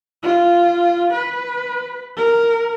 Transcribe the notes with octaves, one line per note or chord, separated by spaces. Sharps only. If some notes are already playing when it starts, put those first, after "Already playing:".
F4
B4
A#4